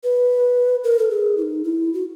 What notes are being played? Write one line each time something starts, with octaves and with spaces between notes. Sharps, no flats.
B4
A#4
A4
G#4
E4
D#4
E4
F#4